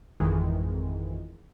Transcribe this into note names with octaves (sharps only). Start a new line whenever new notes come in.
G#1 F2 D#3 E3 G#3